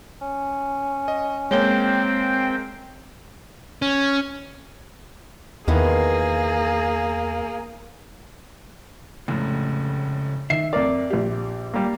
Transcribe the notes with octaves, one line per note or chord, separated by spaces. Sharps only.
C#4
D#5
G#3 A#3 C4 C#5 G5 G7
C#4
E2 D#3 A#3 B3 E4 G#4
F1 C#2 A2
D#3 E5 C7
F2 A#4 D5
A#1 G4
G3 A#3